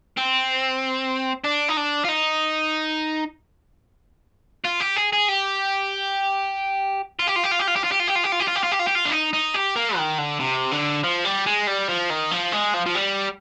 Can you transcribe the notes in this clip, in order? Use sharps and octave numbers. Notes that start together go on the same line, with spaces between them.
C4
D4
D#4
D4
F4
D#4
F4
G4
G#4
G#4
G4
F4
G4
F4
G4
F4
G4
F4
G4
F4
G4
F4
G4
F4
G4
F4
G4
F4
G4
F4
G4
F4
G4
F4
D4
D#4
D#4
G4
A#3
D#3
D3
C3
D3
F3
G3
G#3
G3
F3
D#3
F3
G#3
F3
F3
G3